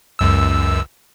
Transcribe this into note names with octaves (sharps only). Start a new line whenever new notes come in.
C#2 F#2 E6